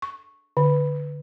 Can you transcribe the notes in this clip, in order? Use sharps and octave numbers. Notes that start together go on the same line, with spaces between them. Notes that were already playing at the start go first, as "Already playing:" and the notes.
C#6
D3